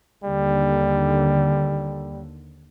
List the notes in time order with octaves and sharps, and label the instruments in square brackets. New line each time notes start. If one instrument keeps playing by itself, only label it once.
[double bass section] D#2 D3 [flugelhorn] G3